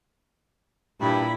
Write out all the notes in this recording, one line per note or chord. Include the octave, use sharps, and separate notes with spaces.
G2 A#2 E4 B5